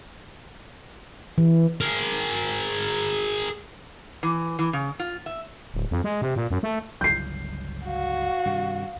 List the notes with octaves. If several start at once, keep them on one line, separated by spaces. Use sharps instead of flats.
E3
G#4 A#4
E3
E3
C#3
F4
E5
D1
F2
G#3
C3
A#2
F#2
A3
G1 C#2 F#3 G6 C7
F#4 F5
G2 C3 D#3